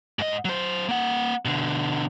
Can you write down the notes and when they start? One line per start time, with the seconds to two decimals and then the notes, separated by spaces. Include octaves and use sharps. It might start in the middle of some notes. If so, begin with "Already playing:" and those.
0.19 G#2 D#5
0.45 F#3 C5
0.89 A#3 F#5
1.45 B2 D3